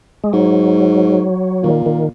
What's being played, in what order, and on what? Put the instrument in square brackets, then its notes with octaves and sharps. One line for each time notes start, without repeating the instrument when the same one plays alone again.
[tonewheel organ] G#3
[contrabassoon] G#2 [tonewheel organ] F#3
[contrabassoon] A#2 [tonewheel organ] D#3
[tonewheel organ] D#3